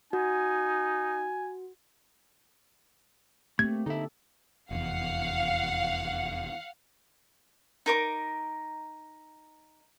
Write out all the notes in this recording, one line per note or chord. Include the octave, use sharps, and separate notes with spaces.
D#4 F#4 G#5
A3 A#3 C4 G4 G#6
D3 D#4 A4 E5
F1 E2 F5 F#5
D#4 A#4 D6